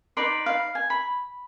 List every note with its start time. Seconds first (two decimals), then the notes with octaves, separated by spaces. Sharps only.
0.17 D#4 B4 D5 C6
0.46 F5
0.75 G#5
0.90 B5